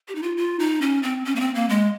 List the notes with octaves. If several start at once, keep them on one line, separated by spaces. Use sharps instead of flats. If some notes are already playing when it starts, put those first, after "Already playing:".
G4
D#4
F4
F4
D#4
C#4
C4
C#4
A#3
C4
A#3
G#3